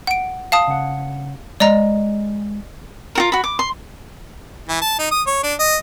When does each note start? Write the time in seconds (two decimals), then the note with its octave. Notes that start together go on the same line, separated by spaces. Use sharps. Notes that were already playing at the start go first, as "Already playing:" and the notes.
0.07 F#5 D7
0.52 F5 A5 D#6
0.67 C#3 F#5
1.60 G#3 D5 D#5 A#5
3.15 F4 F#4 A#4
3.32 F#4 B5
3.44 D6
3.59 C6
4.69 E3
4.81 A5
4.99 D#4
5.11 D#6
5.27 C#5
5.43 D4
5.59 D#5